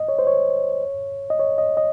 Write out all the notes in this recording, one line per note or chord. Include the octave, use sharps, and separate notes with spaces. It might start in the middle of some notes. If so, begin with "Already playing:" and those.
Already playing: D#5
C#5
C5
C#5
D#5
C#5
D#5
D#5